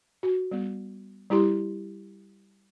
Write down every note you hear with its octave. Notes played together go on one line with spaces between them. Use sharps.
F#4
G3 B3
G3 E4 G4 C6